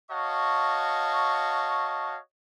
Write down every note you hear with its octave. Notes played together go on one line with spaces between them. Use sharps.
F#4 C#5 D#5 F5 A5 C#6